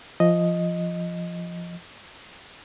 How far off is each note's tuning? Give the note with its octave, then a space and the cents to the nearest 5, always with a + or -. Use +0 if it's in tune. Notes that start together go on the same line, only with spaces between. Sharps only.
F3 -10 D#5 +0